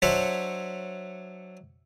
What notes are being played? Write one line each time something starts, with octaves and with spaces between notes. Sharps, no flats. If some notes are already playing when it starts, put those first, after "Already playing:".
F#3 D4 C5 C#5 E5